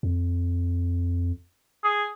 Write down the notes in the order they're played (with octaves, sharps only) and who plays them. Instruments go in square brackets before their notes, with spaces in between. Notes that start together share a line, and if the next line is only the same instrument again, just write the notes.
[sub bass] F2
[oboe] G#4